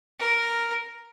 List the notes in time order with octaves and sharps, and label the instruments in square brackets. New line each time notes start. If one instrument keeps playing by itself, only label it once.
[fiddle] A#4